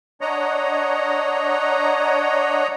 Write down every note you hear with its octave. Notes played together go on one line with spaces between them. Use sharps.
D4 C#5 D#5 F#5 A#5